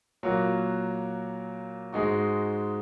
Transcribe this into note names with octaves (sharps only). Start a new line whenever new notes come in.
A#2 F#3 A#3 F#4 A#4
G#2 G#3 D#4 F#4